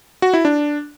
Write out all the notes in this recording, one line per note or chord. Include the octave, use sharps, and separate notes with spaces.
F#4
E4
D4